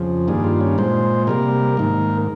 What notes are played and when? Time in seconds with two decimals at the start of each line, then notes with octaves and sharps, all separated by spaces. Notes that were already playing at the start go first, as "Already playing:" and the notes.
Already playing: F2 C#3 F3
0.28 G2 D#3 G3 A#3 G#4
0.44 F4
0.61 C#4
0.78 A#2 G#3 C5
1.27 C3 G3 A#3 A#4
1.77 G#2 D#3 A#3